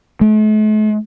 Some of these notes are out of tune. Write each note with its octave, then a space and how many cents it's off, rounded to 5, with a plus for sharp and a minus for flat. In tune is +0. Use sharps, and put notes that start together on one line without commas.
A3 -45